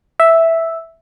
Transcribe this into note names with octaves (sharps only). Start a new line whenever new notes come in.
E5